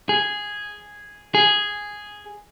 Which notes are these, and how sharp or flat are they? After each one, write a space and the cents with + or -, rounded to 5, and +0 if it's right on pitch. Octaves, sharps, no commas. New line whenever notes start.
G#4 -5
G#4 -5